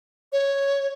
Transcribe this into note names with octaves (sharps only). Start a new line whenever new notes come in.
C#5